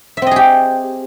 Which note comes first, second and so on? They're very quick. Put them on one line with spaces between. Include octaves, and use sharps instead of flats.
E5 C4 D#5 G#4 G4